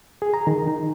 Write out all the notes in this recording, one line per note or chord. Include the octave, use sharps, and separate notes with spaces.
G#4
A#5
D#3
D#4